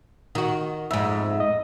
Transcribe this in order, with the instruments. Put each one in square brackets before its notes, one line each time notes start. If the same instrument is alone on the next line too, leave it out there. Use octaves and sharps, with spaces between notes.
[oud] D#3 F#4
[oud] F2 G#2 [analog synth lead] E5
[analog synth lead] D#5